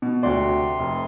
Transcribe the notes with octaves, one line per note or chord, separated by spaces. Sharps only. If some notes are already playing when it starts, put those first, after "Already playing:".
B2
D2 C3 F#4 D5 C6
F1